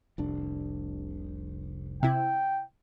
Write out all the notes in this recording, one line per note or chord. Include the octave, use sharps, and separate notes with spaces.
F1 C2 D4
C3 E4 G5